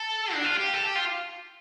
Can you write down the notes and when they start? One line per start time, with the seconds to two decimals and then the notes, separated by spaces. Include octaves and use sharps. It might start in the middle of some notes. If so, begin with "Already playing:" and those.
Already playing: A4
0.33 D4
0.44 F4
0.56 G4
0.73 A4
0.84 G4
0.95 F4